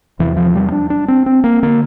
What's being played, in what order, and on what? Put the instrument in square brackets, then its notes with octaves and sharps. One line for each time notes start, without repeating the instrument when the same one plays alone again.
[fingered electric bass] E2 C3 E3
F3
G3
D4
D4
C4
C4
A#3
D3 A#3